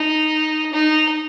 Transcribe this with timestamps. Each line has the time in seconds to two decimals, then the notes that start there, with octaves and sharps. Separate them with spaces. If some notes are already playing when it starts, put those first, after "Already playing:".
Already playing: D#4
0.73 D#4